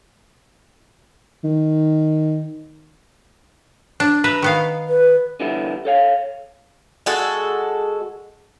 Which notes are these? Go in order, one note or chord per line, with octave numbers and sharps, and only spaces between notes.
D#3
D4
B4 E5 A#5
D#3 B3 F5
B4
D3 E3 G3 B3 E4
A4 C#5 F5
G#3 F#4 A4